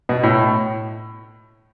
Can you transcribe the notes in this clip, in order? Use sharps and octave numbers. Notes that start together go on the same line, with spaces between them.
B2
A2